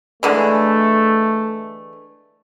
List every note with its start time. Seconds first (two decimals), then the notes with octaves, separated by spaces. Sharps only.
0.23 D3 E3 G#3 A3